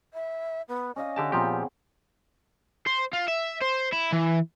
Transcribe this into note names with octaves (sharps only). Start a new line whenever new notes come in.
E5
B3
C#4 D5 D#5 F5
D3 G4 G#4 A5
A#2 F3 B3 C4 G4
C5
F4
E5
C5
E4
E3